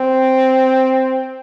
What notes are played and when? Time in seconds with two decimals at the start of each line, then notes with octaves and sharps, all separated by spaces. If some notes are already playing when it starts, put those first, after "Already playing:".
Already playing: C4